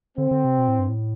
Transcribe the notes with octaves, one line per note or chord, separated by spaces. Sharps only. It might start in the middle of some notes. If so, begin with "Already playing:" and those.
D3 C4
D3
C3
B2
A2
G2
A2